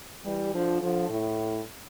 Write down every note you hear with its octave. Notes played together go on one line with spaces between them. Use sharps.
E3 G3
D3 F3
D3 F3
A2